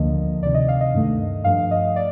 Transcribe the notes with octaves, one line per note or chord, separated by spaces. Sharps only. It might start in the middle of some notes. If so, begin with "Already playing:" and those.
Already playing: D2 D3 F3 A#3 D#5
D2 C3 D#3 D5
D#5
F5
D#5
G2 D#3 A3
G2 F3 A3 F5
D#5
D5